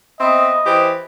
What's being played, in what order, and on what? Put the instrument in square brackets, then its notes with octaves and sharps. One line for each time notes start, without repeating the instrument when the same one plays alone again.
[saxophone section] B3 C4 E5 [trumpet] D#5
[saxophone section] E3 G4 C5